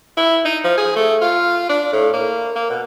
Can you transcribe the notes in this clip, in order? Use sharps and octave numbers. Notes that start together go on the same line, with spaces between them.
E4
D#4
F3
G#4
A3
F4
D4
A2
A#3
A#3
B2